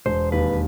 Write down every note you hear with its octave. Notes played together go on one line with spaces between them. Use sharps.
E1 C5
D#2 B4